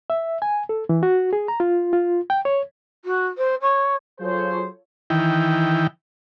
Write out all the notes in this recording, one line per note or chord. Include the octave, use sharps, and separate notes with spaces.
E5
G#5
A4
E3
F#4
G#4
A#5
F4
F4
G5
C#5
F#4
C5
C#5
F#3 F4 G#4 A4 C5 C#5
D#3 E3 G5